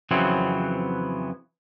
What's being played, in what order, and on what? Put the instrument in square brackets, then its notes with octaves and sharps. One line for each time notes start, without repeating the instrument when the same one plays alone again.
[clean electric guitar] F2 C#3 E3 F#3 B3 C4